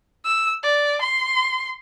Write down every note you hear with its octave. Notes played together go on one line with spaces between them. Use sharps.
E6
D5
C6